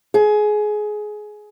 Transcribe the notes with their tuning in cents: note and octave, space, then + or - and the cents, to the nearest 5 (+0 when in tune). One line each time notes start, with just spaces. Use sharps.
G#4 +20